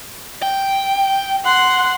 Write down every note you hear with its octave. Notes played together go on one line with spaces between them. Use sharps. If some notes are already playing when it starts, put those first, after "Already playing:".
G5
F#5 C6